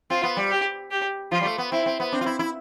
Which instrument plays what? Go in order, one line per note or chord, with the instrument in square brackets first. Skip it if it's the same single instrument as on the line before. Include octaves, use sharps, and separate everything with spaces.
[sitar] C4 [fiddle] F4
[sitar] B3
G3
[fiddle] G4
G4
[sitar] F3 [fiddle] F4
[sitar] G3
A3
B3
[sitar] C4 [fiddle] E4
[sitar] C4
B3
[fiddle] C4 [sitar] D4
[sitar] F4
E4
E4